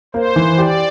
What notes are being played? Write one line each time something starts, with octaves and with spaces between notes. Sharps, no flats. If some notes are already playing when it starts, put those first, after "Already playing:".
A#3 C5
E3
G4 D5